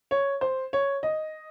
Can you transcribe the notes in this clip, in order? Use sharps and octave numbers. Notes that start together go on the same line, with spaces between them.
C#5
C5
C#5
D#5